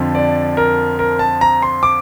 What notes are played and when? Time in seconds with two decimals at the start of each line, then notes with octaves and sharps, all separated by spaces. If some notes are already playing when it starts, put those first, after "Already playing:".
Already playing: F2 D3 F3
0.15 D5
0.57 A#4
0.99 A#4
1.19 A5
1.41 A#5
1.62 C6
1.83 D6